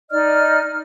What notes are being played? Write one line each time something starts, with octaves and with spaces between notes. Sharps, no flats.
D#4 D5 D#5 F6